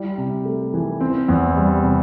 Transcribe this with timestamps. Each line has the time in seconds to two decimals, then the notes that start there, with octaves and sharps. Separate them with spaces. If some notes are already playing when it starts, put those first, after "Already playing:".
Already playing: G3 E4
0.18 C3
0.45 A3
0.74 E3
1.01 C4
1.28 E2
1.56 G3
1.83 C3